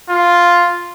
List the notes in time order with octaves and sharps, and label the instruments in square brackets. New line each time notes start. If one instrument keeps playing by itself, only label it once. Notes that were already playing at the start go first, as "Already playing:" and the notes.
[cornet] F4